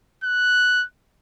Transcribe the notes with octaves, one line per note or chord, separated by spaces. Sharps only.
F#6